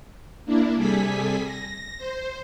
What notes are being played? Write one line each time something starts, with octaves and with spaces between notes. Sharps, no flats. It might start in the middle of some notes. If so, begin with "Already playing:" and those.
A#3 D4 E4
C3 G3 G#4 A4 G#5 B6
A#6
C5